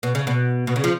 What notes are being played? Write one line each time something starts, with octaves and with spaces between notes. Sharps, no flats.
B2
C#3
B2
B2
C#3
F3